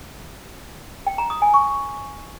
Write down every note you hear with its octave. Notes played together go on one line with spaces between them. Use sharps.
G5
A#5
D#6
G#5
C#6